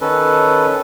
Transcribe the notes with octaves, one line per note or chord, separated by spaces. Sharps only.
D#3 C#4 A4 B4